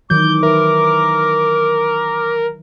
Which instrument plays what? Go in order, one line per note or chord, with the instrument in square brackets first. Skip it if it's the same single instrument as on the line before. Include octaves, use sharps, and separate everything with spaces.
[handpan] D#3 E3 F#3 [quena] D6 [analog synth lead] G6
[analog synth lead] A#4 [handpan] B4 E5